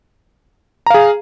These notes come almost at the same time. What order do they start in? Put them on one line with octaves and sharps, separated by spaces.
A#5 F5 G#4